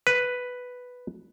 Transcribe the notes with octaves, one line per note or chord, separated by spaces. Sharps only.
B4